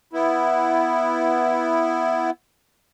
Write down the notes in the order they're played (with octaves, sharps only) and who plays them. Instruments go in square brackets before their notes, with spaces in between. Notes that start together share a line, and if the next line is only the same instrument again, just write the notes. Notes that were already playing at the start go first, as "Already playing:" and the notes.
[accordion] B3 E4